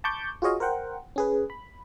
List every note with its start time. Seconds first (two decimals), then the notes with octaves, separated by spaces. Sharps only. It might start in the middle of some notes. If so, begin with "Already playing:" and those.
0.04 A5 B5 C#6 D6 G6
0.42 F4 F#4 G#4 C#5 D#5 F5
0.60 A#4 C5 F#5 G5
1.16 C#4 G#4 B4
1.50 B5